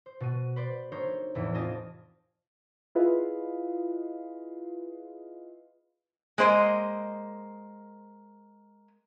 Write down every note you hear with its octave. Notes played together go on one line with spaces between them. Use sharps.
C5
B2 F#4 D#7
B4 C5 D5
A3 D4 D#4 A#4 C5 C#5
F1 E2 A2 E5
C4 F4 D5 D#5 G#5 A5
E4 F4 G#4 B4 D#5 F5
G#3 A#3 C5 D#5